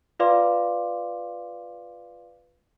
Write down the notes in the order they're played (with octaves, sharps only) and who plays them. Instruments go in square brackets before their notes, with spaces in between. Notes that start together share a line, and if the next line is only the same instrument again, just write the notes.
[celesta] F4 B4 D5 F5 C6 D6